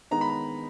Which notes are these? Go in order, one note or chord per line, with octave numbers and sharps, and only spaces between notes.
D#3 G#3 B3 D#4 A#5
B5
A#5